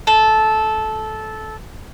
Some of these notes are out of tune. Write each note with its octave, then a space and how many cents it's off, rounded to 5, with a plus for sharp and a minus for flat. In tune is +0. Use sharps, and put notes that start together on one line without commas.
A4 -15